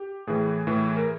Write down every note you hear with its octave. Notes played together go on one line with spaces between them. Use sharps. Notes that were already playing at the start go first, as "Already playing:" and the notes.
Already playing: G4
A2 E3 G#4
A2 E3
A#4